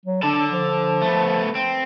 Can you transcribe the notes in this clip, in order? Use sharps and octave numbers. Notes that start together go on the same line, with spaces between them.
F#3
D3 D4 A4
F3
A3 B3
C4